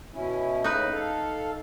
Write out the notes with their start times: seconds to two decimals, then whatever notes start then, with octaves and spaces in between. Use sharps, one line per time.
0.15 B2 C#4 E4
0.64 A2 C#3 D#4 B4
0.93 A4 F5